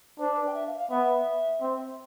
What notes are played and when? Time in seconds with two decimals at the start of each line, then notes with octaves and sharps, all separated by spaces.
0.19 D4 C5
0.37 B4
0.46 G5
0.54 E5
0.67 F5
0.73 E5
0.78 F5
0.90 B3 E5
1.61 C4